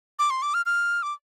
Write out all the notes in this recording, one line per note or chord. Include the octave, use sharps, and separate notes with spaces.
D6
C6
D6
F6
F6
D6